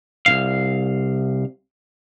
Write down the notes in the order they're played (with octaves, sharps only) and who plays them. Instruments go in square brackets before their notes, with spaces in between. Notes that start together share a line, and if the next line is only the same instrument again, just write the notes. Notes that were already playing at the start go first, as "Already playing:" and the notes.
[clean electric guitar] C2 D#3 F5